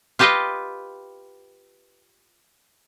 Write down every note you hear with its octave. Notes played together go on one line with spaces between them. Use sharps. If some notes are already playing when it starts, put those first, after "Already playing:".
F4 G4 B4 D#5 F5 G5